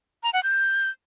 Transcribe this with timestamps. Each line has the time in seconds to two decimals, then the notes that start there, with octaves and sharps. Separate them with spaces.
0.23 A#5
0.33 F#5
0.43 G6